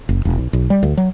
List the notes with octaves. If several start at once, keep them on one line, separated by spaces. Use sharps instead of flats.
F#1
E1
B1
B1
G3
D2
F#3